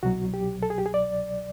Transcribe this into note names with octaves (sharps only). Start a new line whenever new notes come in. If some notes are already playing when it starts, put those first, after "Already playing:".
C2 B2 F#3 F#4
G4
A4
G#4
G4
G#4
D5